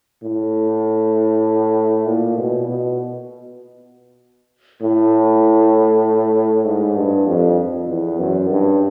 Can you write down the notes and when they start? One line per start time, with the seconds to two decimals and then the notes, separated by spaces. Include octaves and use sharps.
0.23 A2
2.07 A#2
2.38 B2
2.68 B2
4.82 A2
6.66 G#2
6.96 G2
7.27 F2
7.88 E2
8.19 F#2
8.50 G2